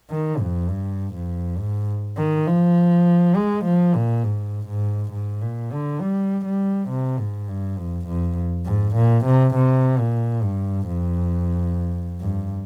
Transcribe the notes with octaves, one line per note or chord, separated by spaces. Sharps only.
D#3
F2
G2
F2
G#2
D#3
F3
G#3
F3
A#2
G#2
G#2
G#2
A#2
D3
G3
G3
C3
G#2
G2
F2
F2
G#2
A#2
C3
C3
A#2
G2
F2
G2